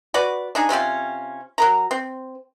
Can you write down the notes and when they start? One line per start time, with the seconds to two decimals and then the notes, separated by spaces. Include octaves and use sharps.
0.14 F#4 B4 D5
0.55 D4 D#4 G#4
0.69 C3 C#4 F4 G5
1.58 F#3 A#4 A#5
1.91 C4